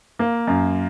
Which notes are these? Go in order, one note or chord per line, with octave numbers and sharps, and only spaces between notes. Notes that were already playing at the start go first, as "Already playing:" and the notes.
A#3
F#2